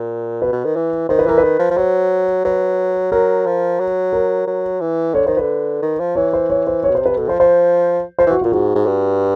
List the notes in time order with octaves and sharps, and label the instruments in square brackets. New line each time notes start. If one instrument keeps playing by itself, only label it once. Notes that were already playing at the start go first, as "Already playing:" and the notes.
Already playing: [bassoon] A#2
[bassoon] B2 [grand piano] B4
[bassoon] B2
D#3
E3
[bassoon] D#3 [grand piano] C5
[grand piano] B4
[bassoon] E3 [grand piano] A#4
[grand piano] B4
[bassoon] D#3
F3
F3
[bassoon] F#3 [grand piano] C5
[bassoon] F#3 [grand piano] B4
[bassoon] F#3 [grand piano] A#4
[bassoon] F3
F#3
[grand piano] A#4
[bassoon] F#3
E3
[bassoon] D3 [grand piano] C#5
[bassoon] D#3 [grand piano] C5
[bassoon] D3 [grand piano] B4
[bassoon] D#3
F3
[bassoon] E3 [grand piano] C#5
[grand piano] C5
C#5
C5
C#5
[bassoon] B2
[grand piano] C5
[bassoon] C3
[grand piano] B4
[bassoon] B2 [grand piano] A4
[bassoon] F3 [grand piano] C5
[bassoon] F3 [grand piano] C5
[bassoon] F3 [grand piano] C5
[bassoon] E3
[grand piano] F#4
[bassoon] A#2 [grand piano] F4
[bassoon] G#2 [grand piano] F#4
[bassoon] G#2
G2